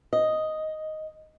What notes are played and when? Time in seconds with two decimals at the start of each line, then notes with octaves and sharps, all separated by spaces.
0.13 D#5